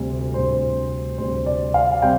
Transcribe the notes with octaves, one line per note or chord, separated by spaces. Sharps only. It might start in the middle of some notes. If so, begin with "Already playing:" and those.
Already playing: D2 C3 G3 C4
D2 C3 G3 C4 C5
D2 C3 G3 C4 C5
D5
F5
C3 G3 C4 G5